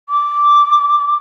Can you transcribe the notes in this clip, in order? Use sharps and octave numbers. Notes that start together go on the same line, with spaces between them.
D6